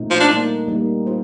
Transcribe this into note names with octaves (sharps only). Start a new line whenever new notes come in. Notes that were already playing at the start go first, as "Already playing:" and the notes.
Already playing: A#2 A3 C4 D#4
F3
D4
G3 A#3 D#4
G3 A#3 D#4
F4 C5